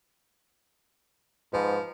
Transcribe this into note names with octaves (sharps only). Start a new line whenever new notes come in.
G#2 F3 B4